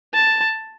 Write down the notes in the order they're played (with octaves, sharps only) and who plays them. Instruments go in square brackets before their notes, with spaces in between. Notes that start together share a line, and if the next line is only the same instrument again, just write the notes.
[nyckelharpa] A5